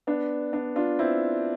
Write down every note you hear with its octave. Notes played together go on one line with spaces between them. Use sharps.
B3 D4
B3 D4
D4 F4
C4 E4